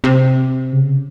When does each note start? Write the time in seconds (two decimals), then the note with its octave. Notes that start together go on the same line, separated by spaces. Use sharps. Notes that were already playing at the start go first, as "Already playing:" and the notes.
0.04 C3
0.73 C#3